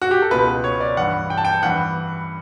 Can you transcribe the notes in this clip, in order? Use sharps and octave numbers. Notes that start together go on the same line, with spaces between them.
F#4
G4
A4
C#2 B2 B4
C#5
D5
G2 E3 F#5
G5
A5
G5
G2 E3 F#5